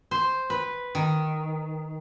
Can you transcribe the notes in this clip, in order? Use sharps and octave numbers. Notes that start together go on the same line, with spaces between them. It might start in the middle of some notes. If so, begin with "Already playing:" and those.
C5
B4
D#3